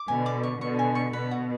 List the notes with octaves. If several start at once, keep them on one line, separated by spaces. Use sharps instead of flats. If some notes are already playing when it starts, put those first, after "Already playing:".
Already playing: D6
B2 D3 G#5
D5
C#6
B2 D3 C#6
G#5
C#6
B2 B4
F#4